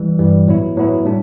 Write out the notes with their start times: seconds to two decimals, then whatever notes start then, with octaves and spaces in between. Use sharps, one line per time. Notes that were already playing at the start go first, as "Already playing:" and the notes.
Already playing: E3 G3
0.19 G2 E3 G3
0.47 A2 F#3 B3 E4
0.76 A2 F#3 B3 E4
1.05 A2 G3 D4